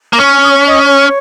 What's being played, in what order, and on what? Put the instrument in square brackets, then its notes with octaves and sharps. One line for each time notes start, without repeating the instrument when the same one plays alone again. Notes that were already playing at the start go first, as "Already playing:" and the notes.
[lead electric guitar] A#3
[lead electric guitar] C#4 [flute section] C#5 C#6
[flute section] D#6
C#5 C#6
D#5 D#6
C#5 C#6